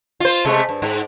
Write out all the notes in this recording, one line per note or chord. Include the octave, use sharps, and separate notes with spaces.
F4 C5
C3 G#3 A3
G2
G#2